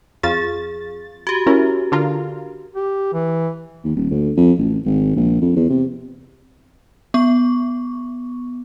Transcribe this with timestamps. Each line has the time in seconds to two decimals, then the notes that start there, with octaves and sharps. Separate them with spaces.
0.23 F2 F4 G#4 A6
1.27 F#4 G4
1.47 C#4 E4 A#4
1.92 D3 F4 A#4
2.76 G4
3.13 E3
3.84 D#2
3.96 D#1
4.11 D2
4.37 F2
4.58 A1
4.86 G#1
5.16 A#1
5.41 F2
5.56 E2
5.70 C3
7.14 B3 C#6